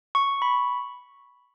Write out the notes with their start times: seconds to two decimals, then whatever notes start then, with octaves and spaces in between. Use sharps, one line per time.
0.15 C#6
0.42 B5